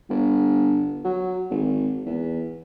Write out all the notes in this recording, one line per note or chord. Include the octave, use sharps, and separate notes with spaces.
G1
F#3
G#1
E2